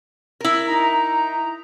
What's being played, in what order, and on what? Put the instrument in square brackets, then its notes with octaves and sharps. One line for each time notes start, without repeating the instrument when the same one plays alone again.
[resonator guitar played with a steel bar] E4 A#4
[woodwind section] D#4 A#5